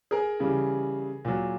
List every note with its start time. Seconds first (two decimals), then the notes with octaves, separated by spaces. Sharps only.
0.11 G#4 A#4
0.40 C#3 E3 G3
1.25 A#2 F#3